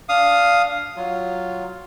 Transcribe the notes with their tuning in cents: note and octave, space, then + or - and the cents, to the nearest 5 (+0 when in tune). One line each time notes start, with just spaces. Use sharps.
D4 -15 F5 +0 D#6 +0
F#3 +0 F4 +0